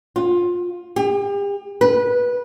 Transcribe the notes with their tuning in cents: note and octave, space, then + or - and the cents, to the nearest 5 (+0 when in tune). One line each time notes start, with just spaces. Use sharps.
F4 +20
G4 +40
B4 -15